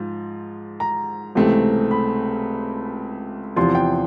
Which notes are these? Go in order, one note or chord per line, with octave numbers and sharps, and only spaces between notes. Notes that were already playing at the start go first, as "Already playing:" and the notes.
Already playing: G#2 F3
A#5
C#2 C3 E3 A3 C4
B5
E2 C3 F3 C6
G5